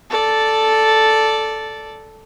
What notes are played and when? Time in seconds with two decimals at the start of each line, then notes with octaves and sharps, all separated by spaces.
0.10 A4 D5